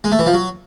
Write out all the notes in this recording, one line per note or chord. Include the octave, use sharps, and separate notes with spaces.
G#3
A3
E3
F3
F#3